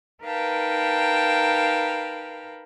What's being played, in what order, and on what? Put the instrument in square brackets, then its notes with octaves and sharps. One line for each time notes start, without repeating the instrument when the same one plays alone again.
[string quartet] D#4 A#4 B4 F5 G5 A5